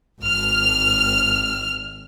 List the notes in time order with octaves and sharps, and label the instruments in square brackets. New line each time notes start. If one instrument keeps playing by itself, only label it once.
[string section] G#1 F6